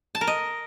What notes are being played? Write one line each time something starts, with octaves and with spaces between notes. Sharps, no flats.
A5
A#4
D#5